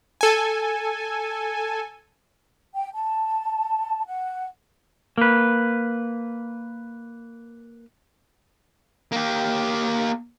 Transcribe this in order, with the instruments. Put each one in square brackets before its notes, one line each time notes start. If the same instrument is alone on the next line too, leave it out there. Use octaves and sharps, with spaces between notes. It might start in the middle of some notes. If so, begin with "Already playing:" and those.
[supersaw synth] A4 G#5
[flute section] G5
A5
F#5
[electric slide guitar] A#3 B4
[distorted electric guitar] A#3 G4